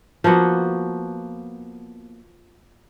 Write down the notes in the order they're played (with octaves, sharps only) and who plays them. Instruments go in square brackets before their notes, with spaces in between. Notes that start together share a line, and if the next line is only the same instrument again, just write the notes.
[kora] F3 A#3 B3 F#4